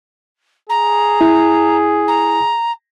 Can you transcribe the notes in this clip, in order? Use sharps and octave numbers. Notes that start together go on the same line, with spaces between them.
G#4 A#5
E4
A#5